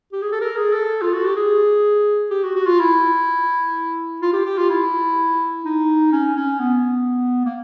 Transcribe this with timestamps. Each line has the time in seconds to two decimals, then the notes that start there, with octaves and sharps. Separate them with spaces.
0.12 G4
0.22 G#4
0.32 A4
0.41 A#4
0.56 G#4
0.73 A4
1.02 F4
1.14 F#4
1.25 G4
1.36 G#4
2.31 G4
2.44 F#4
2.55 F#4
2.66 F4
2.79 E4
4.22 F4
4.33 G4
4.45 G4
4.58 F4
4.70 E4
5.65 D#4
6.12 C#4
6.36 C#4
6.60 B3
7.45 A#3